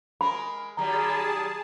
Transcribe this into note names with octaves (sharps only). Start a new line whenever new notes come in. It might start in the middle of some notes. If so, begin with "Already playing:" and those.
G#3 A#4 B5
D#3 F#3 G3 G#4 A5 A#5